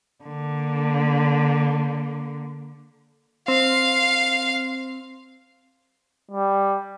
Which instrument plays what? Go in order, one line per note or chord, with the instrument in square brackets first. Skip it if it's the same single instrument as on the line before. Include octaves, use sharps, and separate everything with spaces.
[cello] D3 A#3
[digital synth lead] C4 [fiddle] F5
[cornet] G3